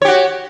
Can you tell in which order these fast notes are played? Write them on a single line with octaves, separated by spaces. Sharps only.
C#5 G4 F#4